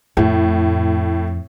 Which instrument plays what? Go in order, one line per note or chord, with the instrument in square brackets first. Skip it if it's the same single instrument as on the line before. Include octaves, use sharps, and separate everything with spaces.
[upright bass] F2 [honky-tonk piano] A2